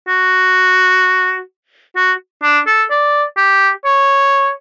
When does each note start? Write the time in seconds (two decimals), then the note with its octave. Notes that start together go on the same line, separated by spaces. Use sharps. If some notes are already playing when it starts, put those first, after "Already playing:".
0.08 F#4
1.96 F#4
2.43 D4
2.67 A4
2.91 D5
3.37 G4
3.85 C#5